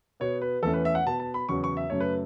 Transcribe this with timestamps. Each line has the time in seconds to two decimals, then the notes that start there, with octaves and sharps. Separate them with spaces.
0.20 B2 B3 C#5
0.42 B4
0.63 E2 E3 A3 C#4 A4
0.74 B4
0.85 E5
0.95 F#5
1.06 B2 B3 A5
1.20 A5
1.34 B5
1.49 E2 C#3 F#3 B3 C#6
1.64 C#6
1.77 E5
1.90 F#2 C#3 A3 C#5
2.00 B4